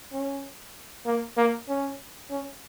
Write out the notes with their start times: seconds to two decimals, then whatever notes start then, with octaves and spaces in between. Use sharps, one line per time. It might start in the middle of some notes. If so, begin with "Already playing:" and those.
0.12 C#4
1.06 A#3
1.37 A#3
1.68 C#4
2.30 C#4